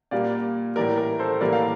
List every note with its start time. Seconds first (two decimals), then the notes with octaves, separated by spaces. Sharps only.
0.11 A#2 G3 A#3 D5 F5
0.76 A2 E3 G3 A#4 D5
0.97 A#4
1.19 A4 C5
1.41 A2 E3 G3 A#3 A#4 D5
1.53 F5